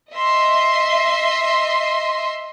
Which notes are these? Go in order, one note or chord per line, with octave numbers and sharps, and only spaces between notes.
D#5 E5 C6